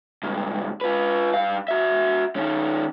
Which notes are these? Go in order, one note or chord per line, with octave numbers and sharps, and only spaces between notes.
C#2 G2
F4 B4
G2 F5
F#4 E5
D#3 C#4